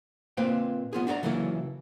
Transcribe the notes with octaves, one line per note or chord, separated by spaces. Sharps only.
A#2 A#3 C4 B4 F5 G5
B3 F4 G#4
D4 F#4 D5 A#5
C#3 E3 F#3 A#3 E4 A4